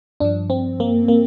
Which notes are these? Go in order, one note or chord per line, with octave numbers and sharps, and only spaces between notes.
G2 F3 D4
C4
A#3
A#3